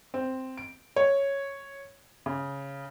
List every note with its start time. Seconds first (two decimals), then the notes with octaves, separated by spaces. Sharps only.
0.14 C4
0.57 D7
0.96 C#5
2.26 C#3